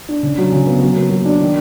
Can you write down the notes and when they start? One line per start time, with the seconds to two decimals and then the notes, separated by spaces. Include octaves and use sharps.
0.09 D4
0.23 C#3
0.38 F#3
0.52 C#3
0.67 B3
0.82 F#3
0.96 A#3
1.11 F#3
1.25 D4
1.40 D#3